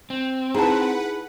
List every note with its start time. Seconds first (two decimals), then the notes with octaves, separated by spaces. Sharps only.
0.10 C4
0.54 D#4 E4 G#4 B4 F#5 A5